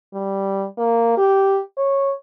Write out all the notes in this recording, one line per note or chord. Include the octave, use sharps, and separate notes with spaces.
G3
A#3
G4
C#5